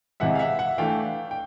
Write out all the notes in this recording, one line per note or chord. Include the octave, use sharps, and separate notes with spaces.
C3 E3 G#3 E5 F#5
F5
E5 F#5
E5 F#5
E3 A3 D4 F5 G5
G5